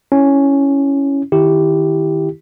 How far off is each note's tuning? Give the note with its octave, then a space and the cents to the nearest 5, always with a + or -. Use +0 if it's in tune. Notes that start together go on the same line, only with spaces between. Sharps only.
C#4 +0 E4 +0
D#3 +0 E4 +0 G4 +0